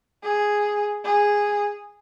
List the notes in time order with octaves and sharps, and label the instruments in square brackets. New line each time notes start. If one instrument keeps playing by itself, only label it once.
[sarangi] G#4
G#4